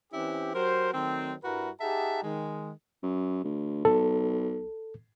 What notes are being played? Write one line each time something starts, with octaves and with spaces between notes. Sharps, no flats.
E3 C4 C#4 E4 G4
F#3 F#4 G4 A#4 C5
D#3 F#3 A3 C4
G2 G3 E4 F#4 A#4 B4
D#4 G4 G#4 E5 F#5 A5
D#3 G#3
F#2
D2
B1 A4